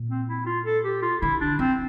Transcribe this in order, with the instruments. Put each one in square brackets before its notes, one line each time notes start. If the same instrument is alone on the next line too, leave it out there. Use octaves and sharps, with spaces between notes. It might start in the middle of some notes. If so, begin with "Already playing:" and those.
Already playing: [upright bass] A#2
[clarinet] C4
E4
F4
A4
G4
F4
[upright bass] D3 [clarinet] E4
[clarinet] D4
[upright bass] E3 [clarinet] C4